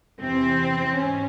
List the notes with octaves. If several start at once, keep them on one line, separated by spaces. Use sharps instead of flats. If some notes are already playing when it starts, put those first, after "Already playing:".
E2 C3 E3 C4
G#2 C#4